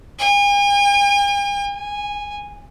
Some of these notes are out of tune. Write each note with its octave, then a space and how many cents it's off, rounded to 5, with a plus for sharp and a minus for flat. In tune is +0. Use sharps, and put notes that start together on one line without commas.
G#5 -45
G#5 -10